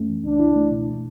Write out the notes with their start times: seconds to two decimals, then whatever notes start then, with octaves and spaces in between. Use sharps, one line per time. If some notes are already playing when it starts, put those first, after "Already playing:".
Already playing: F#2 A3 C#4
0.08 E3
0.24 C#2 D4
0.40 E4
0.56 A3
0.71 B2
0.87 B2